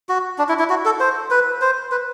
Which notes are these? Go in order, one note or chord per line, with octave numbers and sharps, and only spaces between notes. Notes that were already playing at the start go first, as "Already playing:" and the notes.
F#4
D4
E4
E4
F#4
A4
C5
B4
C5
B4